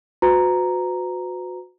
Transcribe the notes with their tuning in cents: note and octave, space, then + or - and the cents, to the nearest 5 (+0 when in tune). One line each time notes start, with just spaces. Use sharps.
F#4 -25 B4 +40 A#5 +0